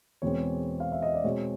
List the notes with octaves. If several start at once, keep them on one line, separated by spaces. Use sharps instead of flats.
E2 B2 G#3 C4 C#5
F5
E5
D#5
D5
B2 G#3 C4 C#5